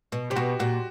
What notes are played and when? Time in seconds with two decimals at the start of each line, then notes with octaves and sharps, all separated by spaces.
0.12 B2
0.30 C3 G4
0.36 B2 F#4
0.59 A#2 F#4